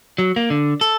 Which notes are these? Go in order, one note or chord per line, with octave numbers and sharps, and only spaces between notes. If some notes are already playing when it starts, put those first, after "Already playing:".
F#3
A#3
D3
A4